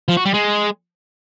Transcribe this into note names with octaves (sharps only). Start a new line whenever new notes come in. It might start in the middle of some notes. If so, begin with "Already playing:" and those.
F3
F#4
G3
G#3